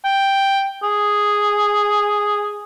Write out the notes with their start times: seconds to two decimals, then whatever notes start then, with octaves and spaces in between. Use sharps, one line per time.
0.05 G5
0.83 G#4